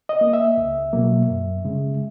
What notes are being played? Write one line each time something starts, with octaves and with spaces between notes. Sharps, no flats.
D#5
A#3
E5
C#2
B2 F#3 A#3
F#2
C#3 G#3